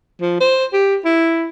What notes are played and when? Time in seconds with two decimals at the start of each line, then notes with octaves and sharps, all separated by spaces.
0.21 F3
0.40 C5
0.73 G4
1.05 E4